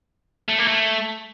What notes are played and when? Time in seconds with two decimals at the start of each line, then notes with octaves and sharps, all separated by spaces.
0.48 A3
0.58 A#3
0.67 A3